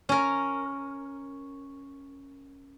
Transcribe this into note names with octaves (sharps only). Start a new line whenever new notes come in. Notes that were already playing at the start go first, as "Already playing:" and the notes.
C#4 A#4